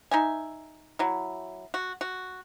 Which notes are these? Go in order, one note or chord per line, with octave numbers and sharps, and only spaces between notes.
D#4 E5 G#5
F#3 E4
F#4
F#4